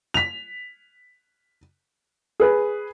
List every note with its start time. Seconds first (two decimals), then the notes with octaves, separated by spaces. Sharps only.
0.14 B6 F7
2.40 G#4 B4